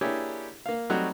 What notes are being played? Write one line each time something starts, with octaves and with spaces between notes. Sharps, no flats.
A#3 D4 E4 G4 G#4 C#5
A#3 F5
F#3 G3 A3 C4 D#4 F#4